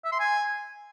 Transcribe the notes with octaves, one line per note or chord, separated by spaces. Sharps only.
E5
C6
G#5